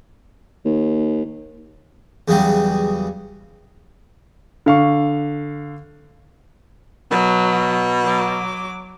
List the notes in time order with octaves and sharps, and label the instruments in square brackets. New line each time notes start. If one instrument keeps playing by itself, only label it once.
[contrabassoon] D#2
[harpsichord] E2 C#3 F#3 G3
[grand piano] D3 F5 C#6
[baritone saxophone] B2 [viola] F#3
[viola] F#3 D6